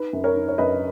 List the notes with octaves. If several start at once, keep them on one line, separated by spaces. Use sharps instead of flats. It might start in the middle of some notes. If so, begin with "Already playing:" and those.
Already playing: D#4 B4
F#2
A#4 C#5
D#4
C#5
F#2 B4 D#5